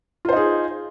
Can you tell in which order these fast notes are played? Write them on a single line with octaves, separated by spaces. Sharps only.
F4 C5 D#4 G#4